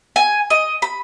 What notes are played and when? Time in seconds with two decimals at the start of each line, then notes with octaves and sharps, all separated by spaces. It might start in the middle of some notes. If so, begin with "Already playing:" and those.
0.16 G#5
0.50 D#5
0.82 B5